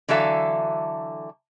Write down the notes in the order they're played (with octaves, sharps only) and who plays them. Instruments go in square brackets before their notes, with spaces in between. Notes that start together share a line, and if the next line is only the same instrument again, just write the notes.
[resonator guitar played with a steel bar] D3 E3 F#3 A4 E5 F5